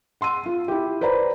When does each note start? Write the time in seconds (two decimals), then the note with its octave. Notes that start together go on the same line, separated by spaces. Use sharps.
0.21 F#5 C6 E6 D#7
0.46 F4
0.68 E4 G4
1.01 B4 C5 D5 A#5 B5